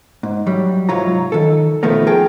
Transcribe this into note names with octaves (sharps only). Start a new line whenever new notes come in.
G#2
F#2 F#3 G3
C2 G#2 F#3 F4 C#5 A#5
D#3 A4
B2 D#3 F3 A3 B3 A#4
G#4 A#4 G5 A5